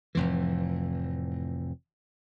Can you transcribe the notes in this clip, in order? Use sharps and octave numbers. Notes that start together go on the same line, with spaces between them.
F1 F2 A2 E3